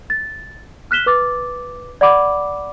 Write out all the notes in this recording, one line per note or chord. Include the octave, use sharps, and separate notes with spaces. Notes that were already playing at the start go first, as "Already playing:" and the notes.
A6
F6 F#6 B6 E7 G7
B4 D6 A6
D5 F#5 B5 D6